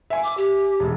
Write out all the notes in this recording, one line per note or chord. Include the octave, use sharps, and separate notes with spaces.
E5 G#5
D6
G4
E1